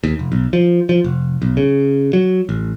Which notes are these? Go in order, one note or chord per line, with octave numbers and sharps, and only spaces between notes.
D#2
F1
B1
F3
F3
F1
B1
C#3
F#3
A1